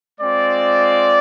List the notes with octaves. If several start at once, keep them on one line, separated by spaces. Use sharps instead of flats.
G#3 C4 F4 D5